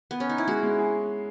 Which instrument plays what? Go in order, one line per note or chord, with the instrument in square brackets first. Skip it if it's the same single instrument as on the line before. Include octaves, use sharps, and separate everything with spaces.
[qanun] B3
C#4
D#4
E4
[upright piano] G#3 [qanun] F#4
[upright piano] G#3
G#4